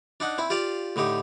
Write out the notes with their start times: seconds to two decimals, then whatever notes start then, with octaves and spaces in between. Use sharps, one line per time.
0.20 D4 D#4 F#5
0.38 C4 E4
0.50 F4 G4 D5 F5
0.96 A2 D3 D#4 G4